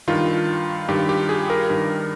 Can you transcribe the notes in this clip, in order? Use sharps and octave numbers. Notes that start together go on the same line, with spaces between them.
G2 D#3 F4
G2 D#3 G4
G4
G#4
A#4
G2 D#3